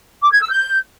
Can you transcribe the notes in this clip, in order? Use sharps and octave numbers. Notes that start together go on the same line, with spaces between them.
D6
G#6
E6
G6